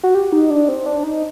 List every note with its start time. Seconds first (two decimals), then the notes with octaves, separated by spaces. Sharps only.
0.03 F#4
0.14 G4
0.32 D#4
0.50 D4
0.68 C4
0.86 D4
1.03 D#4